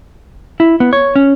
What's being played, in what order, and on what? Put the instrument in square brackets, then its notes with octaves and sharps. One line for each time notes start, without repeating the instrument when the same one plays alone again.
[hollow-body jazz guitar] E4
B3
C#5
C#4